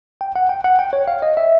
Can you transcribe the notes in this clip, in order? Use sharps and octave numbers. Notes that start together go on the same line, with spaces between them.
G5
F#5
G5
F#5
G5
C#5
F5
D#5
E5